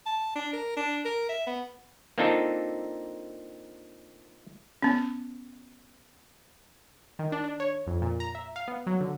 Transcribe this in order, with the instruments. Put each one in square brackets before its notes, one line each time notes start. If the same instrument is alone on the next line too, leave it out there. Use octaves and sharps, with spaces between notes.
[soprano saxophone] A5
D4
A#4
D4
A#4
E5
B3
[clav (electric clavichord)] A#3 C4 D4 D#4 F4 A4
[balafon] B3 C#4
[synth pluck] D#3
D4
D4
C#5
F2
A#2
A#5
E5
F5
B3
F#3
D3